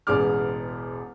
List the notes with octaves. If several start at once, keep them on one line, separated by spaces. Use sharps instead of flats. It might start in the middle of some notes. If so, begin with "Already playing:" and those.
E1 A1 G#4 D6 F6